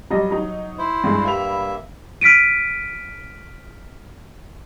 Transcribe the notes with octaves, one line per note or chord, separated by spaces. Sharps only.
F#3 G3 D#5
F#3 D#4
E4 C5
G2 G#3
G2 A#3 E5 B5 F7
F6 B6 D7 D#7